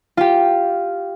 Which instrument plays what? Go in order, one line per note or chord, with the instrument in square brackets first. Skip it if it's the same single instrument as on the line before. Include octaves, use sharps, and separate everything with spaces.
[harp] F4 G4